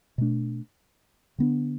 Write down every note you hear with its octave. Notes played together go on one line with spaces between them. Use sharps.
B2 A3 D4
D3 B3 D4